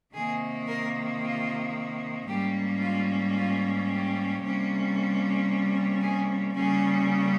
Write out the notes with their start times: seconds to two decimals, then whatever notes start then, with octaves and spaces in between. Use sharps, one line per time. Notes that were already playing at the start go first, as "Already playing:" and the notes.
0.14 C3 D#3 A#3 G#4
0.67 A#4
1.21 F4
2.27 G#2 G3 A#3 C#4 G4
2.81 F4
3.35 F4
3.87 G4
4.41 C3 G3 A#3 C#4
6.01 G#4
6.54 C#3 G3 A#3 C#4 G#4